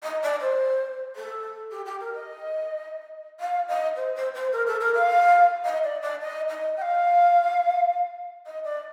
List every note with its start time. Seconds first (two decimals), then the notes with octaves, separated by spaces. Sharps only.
0.03 D#5
0.23 D5
0.41 C5
1.16 A4
1.71 G4
1.86 G4
2.00 A#4
2.14 D#5
3.40 F5
3.68 D#5
3.96 C5
4.15 C5
4.34 C5
4.53 A#4
4.67 A4
4.81 A#4
4.95 F5
5.65 D#5
5.84 D5
6.02 D5
6.21 D#5
6.49 D#5
6.77 G5
6.82 F5
8.46 D#5
8.64 D5